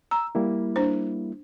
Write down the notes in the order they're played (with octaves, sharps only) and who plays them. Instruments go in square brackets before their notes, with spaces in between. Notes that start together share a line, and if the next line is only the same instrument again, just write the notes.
[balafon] A#5 [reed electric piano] E6
[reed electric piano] G3 A#3 E4
[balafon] D4 C5